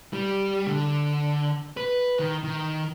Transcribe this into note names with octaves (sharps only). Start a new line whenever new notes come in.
G3
D3
B4
D#3
D#3